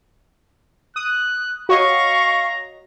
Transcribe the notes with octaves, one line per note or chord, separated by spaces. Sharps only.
D#6 F#6
F#4 C#5 D#5 F5 A#5 C#6